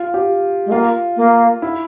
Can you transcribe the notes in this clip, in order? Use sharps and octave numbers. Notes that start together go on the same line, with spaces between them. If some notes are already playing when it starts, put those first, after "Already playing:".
Already playing: F4
G4
G#3
A#3 F4
A#3
E4